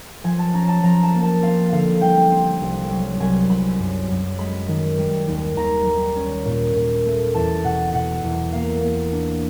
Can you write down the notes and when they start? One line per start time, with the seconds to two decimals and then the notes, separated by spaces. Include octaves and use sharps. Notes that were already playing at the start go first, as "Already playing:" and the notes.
0.24 F3 G#5
0.39 A5
0.54 C#4 A#5
0.68 A5
0.83 F3 A#5
1.03 A5
1.14 A#3
1.23 A5
1.42 C4 F5
1.72 D3 F5
2.01 G3 G5
2.31 C4
2.61 C2
2.91 F#3
3.20 C2 G#5
3.49 C2 B5
3.79 F#2
4.09 F#2
4.38 G#3 B5
4.68 D#3
4.98 G3
5.27 D#2
5.57 D#2 A#5
5.86 G3
6.16 C#4
6.45 A#2
6.75 A#2
7.05 A3
7.34 E2 A5
7.64 B2 F#5
7.94 B2 F#5
8.24 E2
8.53 A#3 F5
8.82 A#3
9.12 D4